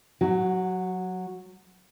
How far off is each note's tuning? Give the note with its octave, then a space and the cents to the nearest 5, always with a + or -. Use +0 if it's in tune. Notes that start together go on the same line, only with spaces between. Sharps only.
F#3 -10 F#4 +25